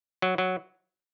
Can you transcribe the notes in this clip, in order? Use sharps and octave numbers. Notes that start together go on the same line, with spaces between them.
F#3
F#3